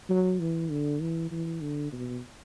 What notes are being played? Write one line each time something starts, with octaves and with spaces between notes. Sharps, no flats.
F#3
E3
D3
E3
E3
D3
B2